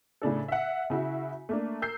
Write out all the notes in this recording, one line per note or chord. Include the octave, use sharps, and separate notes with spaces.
A2 C#3 D4 A4
E5 F#5
C#3 E4 F#4 E5
A3 A#3 D4
A#4 E6 G6 C7